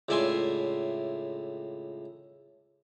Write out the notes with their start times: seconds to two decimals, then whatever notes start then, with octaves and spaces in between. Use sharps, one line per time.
0.09 C#2 A2 D5 E5 G#5 C6